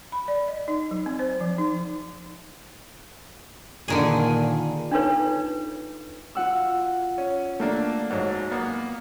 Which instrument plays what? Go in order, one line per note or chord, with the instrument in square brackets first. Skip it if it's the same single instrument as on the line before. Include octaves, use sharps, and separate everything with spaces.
[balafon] B5
D5
D#5
D#4
F#3
C4
C5
F3
D#4
[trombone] A#2 [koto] D3 D#3 G#4
[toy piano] D4 D#4 F4 A4 B4 C#5
[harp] F4 F#5 E6
[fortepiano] C#4
A3 A#3 D4
G#2 F#3
A#3 B3